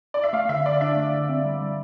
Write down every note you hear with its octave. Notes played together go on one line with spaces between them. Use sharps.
D5
E5
A3 F5
D3 E5
D3 D5
D4 E5
A3
D3
C4
G3
G3